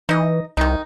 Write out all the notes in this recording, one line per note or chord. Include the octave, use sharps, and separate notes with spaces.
E3 D#4 D#5
C2 D#3 D#4